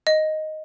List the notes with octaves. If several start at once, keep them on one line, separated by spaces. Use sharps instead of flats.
D#5